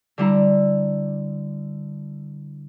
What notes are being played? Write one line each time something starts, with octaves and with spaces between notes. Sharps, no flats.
D3 G3 E4 A#5